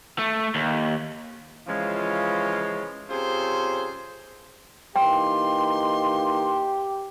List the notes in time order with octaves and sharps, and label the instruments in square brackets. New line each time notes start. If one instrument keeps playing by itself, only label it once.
[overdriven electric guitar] A3
D#2
[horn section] C#3 E3 F3 G#3 C#4 F4
C3 C#4 F4 G#4 A4 C5
[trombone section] E3 A#3 D#4 [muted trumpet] G4 [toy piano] G5 [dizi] C6